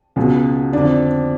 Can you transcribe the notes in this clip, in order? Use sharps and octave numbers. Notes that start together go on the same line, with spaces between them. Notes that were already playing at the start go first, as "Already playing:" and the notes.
C#2 B2
F2 D3 D4